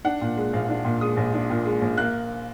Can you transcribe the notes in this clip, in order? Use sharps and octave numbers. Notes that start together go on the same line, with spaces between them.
D4 F#5
A#2
G#3
A#1 F5
D4
A#2
G#3 D#6
A#1
D4
A#2
G#3
A#1
A#3 F#6